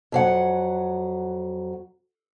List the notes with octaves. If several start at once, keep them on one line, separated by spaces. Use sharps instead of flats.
F2 F#3 F#5